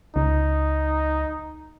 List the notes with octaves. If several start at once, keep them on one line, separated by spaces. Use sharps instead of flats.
C#2 D#4